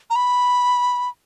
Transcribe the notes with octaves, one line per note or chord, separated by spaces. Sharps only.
A#5
B5